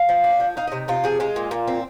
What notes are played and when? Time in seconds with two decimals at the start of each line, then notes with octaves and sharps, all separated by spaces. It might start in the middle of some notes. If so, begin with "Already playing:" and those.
Already playing: F5
0.09 F3
0.24 D4
0.40 F3
0.57 D#4 F5
0.67 C3 D#5
0.88 C3 F4
1.04 F3 G#4
1.20 G#3 F4
1.36 A#2
1.51 A#2
1.67 C4